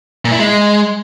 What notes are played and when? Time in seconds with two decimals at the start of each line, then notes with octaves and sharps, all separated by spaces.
0.25 A#2
0.32 E4
0.39 G#3